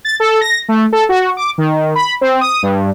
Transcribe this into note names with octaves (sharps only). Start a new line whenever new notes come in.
A6
A4
A#6
A3
A4
F#4
D6
D#3
B5
C4
D#6
G2